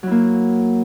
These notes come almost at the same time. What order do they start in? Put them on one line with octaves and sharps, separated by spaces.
F#3 E4 A#3